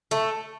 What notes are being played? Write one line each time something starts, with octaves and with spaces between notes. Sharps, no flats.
A3